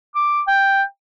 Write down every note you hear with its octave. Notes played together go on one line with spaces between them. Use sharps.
D6
G5